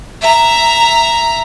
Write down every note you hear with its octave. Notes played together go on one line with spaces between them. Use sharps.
E5 A#5